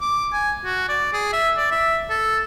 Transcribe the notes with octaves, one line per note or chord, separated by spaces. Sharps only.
D6
G#5
F#4
D5
G#4
E5
D5
E5
A4